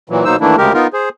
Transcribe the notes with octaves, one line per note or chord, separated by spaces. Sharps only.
A#2 E3 F#3
B2 F#3 A#3 D#4 C5 E6
D#3 E3 A3 A#3 D4 E4
D2 C#3 G#3 G4 A#4
B3 D#4 F4 A#4
G#4 C5